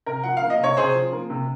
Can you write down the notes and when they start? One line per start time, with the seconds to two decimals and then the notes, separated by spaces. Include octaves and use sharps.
0.06 C3 A#4
0.23 F3 F#5
0.37 F5
0.42 A#3
0.50 D#5
0.59 C3 C#5
0.77 C3 G#4 C5
0.94 F3
1.12 A#3
1.30 C3